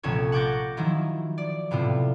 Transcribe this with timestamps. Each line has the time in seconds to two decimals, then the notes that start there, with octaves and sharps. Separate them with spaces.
0.03 A#1 C3 C#4 A4 C#5
0.32 F#5 C#6 D6 G6 A6 A#6
0.77 D#3 F3 F#3 E4
1.38 D5
1.71 A2 C3 B3 E4 F4